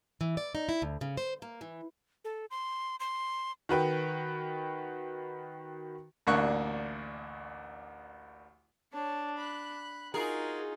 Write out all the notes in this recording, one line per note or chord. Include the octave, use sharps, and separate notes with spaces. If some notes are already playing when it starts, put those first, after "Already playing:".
E3
D5
D#4
E4
D2
C#3
C5
A#3
E3
A4
C6
C6
D#3 F#4 B4 G5
A1 D2 A#3 D4 C#6 F#6
D4 C#5 A5
B5 F#6
D#4 F4 F#4 G#4 A#4